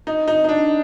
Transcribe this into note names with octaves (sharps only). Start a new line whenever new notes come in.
D#4
D#4
D#4
D4